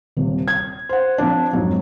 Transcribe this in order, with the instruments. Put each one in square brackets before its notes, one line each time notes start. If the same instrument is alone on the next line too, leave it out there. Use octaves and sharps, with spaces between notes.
[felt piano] D#1 C3
G#6
C5 F#5
F3 C4 D4
F2 G#2 F#3